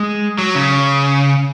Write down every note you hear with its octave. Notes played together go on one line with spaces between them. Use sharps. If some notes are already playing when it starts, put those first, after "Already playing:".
Already playing: G#3
F#3
C#3